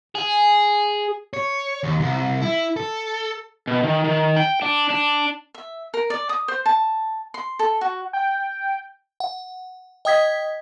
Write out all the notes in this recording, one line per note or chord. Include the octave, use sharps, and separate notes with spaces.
G#4
C#5
D#2
C2
E4
A4
B2
D#3
D#3
G5
D4
D4
E5
A#4
D5
D#6
C5
A5
C6
A4
F#4
G5
F#5
D#5 G5 D#6 G#6 B6